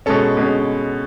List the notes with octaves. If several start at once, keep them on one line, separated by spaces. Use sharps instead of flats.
B2 G#3 C#4 A4
B2 G#3 C#4